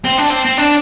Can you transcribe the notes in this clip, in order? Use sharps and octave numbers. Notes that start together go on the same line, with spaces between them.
C4
D4
C4
C4
D4